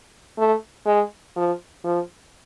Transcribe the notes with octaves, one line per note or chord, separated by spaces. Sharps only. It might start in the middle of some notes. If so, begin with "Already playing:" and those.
A3
G#3
F3
F3